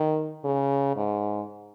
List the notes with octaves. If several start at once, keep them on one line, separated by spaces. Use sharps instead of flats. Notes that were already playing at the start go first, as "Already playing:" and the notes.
Already playing: D#3
C#3
G#2